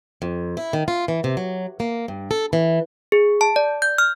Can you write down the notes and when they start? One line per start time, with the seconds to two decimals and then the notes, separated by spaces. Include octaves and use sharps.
0.22 F2
0.57 E4
0.73 D#3
0.88 F4
1.08 E3
1.24 C3
1.37 F#3
1.80 A#3
2.08 G2
2.31 A4
2.53 E3
3.12 G#4
3.41 A5
3.56 D5
3.82 G6
3.98 F6